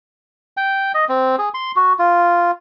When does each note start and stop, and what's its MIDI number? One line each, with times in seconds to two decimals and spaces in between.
0.57 0.92 79
0.94 1.05 75
1.09 1.36 60
1.39 1.49 68
1.54 1.72 84
1.76 1.93 66
1.99 2.51 65